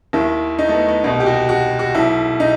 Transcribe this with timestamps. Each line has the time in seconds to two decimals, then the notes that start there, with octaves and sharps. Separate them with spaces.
0.13 D#2 D#3 E4
0.59 D#4
0.69 A3
0.73 B3
0.88 B3
1.04 C2 B2 D#4
1.20 G4
1.26 F#4
1.49 F#4
1.79 F#4
1.95 B1 B2 E4
2.40 D#4